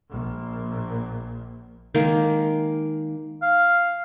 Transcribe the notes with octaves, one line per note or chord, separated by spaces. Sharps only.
A#1 A#2
D#3 G#3 A#3
F5